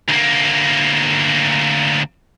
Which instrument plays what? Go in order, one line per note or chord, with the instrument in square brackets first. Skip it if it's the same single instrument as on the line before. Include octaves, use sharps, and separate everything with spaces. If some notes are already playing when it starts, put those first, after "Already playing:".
[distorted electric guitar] D2 A#3